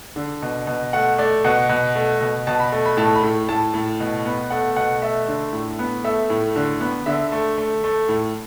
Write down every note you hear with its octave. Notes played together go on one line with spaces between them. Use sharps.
D3
B2
B2
A3 F#5
A3 D5
B2 F#5
B2
A3
B2
B2 A5
B5
A3
B5
A2 A5
B5
A2
A2 A5
A2
B2
B3
A3 F#5
B2 F#5
A3 E5
D3
A2
B3
A3 E5
A2
D3
B3
D3 E5
A3
A3
A3
A2